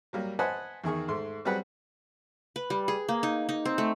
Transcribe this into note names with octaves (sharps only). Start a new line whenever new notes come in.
F#3 G3 A#3
B4 C5 D#5 F#5 G#5 A5
E2 D#3 G#4 C#6
G#2 A3 C6
F#3 G3 C4 G#4 B4 F#5
B4
G3
G#4
A#3
D#4
D#4
C4
A3